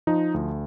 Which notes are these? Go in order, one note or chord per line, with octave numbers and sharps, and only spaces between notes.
F3 D#4
D2